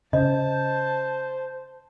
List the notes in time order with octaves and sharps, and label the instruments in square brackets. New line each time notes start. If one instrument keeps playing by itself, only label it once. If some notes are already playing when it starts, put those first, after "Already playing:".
[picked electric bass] C#3 [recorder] C5 [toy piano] D#5 [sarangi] A5